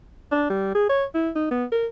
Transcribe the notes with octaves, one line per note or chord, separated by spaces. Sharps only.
D4
G3
G#4
C#5
E4
D#4
B3
A#4